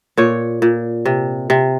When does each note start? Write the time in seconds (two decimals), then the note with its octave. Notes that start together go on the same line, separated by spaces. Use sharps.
0.17 A#2 C#5
0.62 A#2
1.06 C3
1.50 C3